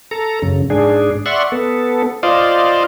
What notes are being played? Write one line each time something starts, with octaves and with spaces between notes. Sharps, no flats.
A4 A#5
F#2 C#3
G#2 D4 G#4
D5 E5 F#5 C6 C#6
B3 A4
F4 C5 D5 D#5 F5